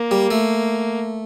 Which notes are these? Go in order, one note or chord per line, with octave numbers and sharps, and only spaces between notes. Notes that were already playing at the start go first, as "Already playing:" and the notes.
Already playing: A#3
G3
A3